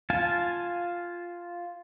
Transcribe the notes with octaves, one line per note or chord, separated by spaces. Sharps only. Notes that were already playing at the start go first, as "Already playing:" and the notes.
F4 F5 G#5 A5